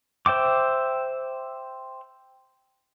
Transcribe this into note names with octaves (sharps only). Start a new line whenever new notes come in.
C5 E5 G5 D6